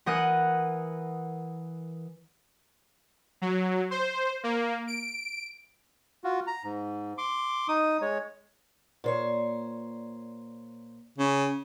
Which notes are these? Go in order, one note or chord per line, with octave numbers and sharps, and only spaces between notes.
E3 A#4 F#5 D#6 F#6
F#3
C5
A#3
D7
F4 F#4
A#5
G#2
C6 D6
D#4 D#6
G#3 C#5
A#2 C5 C#5
C#3